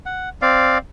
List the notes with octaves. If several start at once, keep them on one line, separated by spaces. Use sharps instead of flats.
F#5
C4 D5 F5